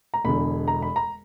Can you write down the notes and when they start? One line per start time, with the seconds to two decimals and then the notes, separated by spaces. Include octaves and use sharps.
0.14 A#5
0.24 E1 E2 D3 B5
0.68 A#5
0.82 B5
0.96 A#5